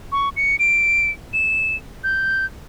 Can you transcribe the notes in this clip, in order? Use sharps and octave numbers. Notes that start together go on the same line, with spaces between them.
C#6
C#7
D7
E7
G6